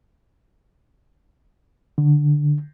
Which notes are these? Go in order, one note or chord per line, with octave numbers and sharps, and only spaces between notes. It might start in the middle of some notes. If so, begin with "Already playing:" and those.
D3